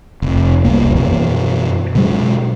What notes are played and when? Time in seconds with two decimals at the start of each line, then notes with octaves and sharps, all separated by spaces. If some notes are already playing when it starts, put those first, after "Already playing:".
0.22 F1
0.64 E1 C2 A#3
0.95 F#2 B2 E3
1.95 B2 F#3 G#3